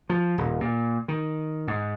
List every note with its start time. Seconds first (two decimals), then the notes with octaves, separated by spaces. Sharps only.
0.10 F3
0.38 D#1
0.61 A#2
1.08 D#3
1.68 G#2